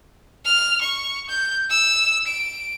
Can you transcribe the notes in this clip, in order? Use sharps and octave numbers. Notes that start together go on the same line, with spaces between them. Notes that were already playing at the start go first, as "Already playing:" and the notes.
F6
C#6
G6
E6
D7